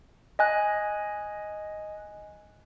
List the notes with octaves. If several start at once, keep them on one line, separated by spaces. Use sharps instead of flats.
D#5 G#5 F#6